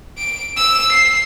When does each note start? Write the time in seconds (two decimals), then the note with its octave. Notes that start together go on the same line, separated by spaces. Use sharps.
0.18 D7
0.57 E6
0.92 C7